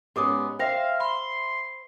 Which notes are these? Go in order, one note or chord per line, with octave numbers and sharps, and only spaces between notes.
G#2 B3 C#4 G4 D6 D#6
C5 E5 F5 G5 A#6
B5 C6